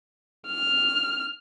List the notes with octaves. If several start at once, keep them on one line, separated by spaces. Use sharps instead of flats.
F6